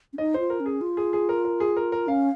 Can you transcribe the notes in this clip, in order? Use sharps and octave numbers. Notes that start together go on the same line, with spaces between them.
C#4
D#4 D#5
F4 C5
A#4
C#4
G#4
F4
G#4
G#4
A#4
A#4
G#4
A#4
A#4
C#4 F5